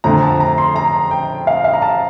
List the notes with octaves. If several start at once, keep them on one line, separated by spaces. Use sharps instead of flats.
F2 D3 F3 A3 A#5
A5
A#5
C6
A#5
G5
F5
F5
A#5
A5